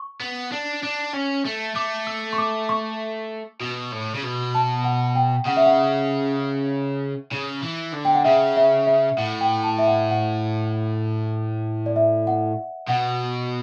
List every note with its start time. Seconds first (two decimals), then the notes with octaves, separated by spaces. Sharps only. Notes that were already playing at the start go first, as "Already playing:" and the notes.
Already playing: C#6
0.21 B3
0.52 D4
0.83 D4
1.14 C#4
1.45 A3
1.75 A3 D6
2.07 E6
2.33 C#6
2.38 D6
2.69 C#6
3.61 B2
3.92 A2
4.15 C#3
4.24 B2
4.55 A5
4.84 F#5
5.15 G5
5.46 C#3 F#5
5.57 E5
5.66 F#5
7.32 C#3
7.64 E3
7.94 D3
8.05 G5
8.15 F#5
8.25 C#3 E5
8.56 E5
8.87 E5
9.17 A2 F#5
9.41 G5
9.64 A5
9.78 E5
9.88 F#5
10.11 F#5
11.86 D5
11.96 E5
12.27 F#5
12.88 B2 F#5